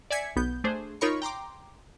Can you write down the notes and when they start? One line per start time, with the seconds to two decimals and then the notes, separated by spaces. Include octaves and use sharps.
0.10 D5 E5 G#5 G#6 B6 C#7
0.36 B1 B3 G6
0.64 A3 D4 G#4 C5
1.01 D#4 F4 A#4 C#5 B5 C#6
1.22 G5 A#5 C6 D6